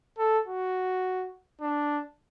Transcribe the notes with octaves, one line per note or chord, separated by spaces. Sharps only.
A4
F#4
D4